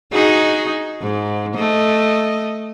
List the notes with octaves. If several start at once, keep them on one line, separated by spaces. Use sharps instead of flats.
D#4 F#4 G#4
G#2
A3 D#5